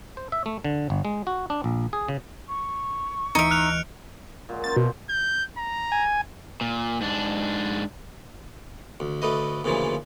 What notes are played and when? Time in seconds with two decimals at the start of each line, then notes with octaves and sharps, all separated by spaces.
0.17 C5
0.32 E5
0.46 A3
0.64 D3
0.90 G1
1.05 G#3
1.27 F#4
1.50 D4
1.64 A#1
1.93 G#4
2.08 C#3
2.48 C#6
3.35 D2 E3 D#4 D#5 E5 C#7 D7
3.51 F6 F#6 F7
4.49 A#2 F#3 G#3
4.64 A#3 C#4 C5 A6
4.76 B2
5.09 G6
5.57 A#5
5.92 G#5
6.61 A#2
7.01 G#2 D4
9.00 D2
9.22 D2 A3 B4 D#5
9.64 D2 A#2 C#3 E3 F3